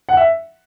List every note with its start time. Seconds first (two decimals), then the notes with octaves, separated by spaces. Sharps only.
0.09 F#5
0.17 E5